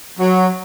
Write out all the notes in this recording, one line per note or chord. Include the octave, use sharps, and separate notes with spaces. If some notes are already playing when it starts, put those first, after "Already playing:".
F#3